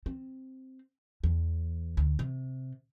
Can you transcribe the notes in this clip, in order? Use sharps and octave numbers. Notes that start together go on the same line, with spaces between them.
C4
E2
D2
C3